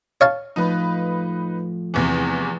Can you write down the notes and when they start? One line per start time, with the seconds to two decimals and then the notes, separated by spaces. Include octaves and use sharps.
0.21 C#5 F5 A5
0.56 A2 F3 D#4 B4
1.94 E2 C3 E3